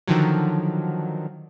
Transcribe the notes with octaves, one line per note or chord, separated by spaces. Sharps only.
D3 D#3 F3 F#3